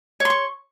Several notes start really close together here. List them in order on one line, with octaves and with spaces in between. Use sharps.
C#5 C6 C#6